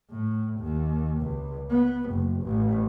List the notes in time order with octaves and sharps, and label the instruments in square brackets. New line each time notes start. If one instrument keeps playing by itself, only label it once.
[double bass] A2
D#2
C#2
B3
F#1
A1